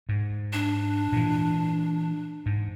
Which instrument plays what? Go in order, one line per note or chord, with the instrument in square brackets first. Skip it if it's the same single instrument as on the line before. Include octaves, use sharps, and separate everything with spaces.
[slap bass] G#2
[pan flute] D4
[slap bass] A#2 E3
G#2